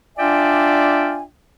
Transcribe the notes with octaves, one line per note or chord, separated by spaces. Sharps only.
D4 F4 D5 E5 G5 G#5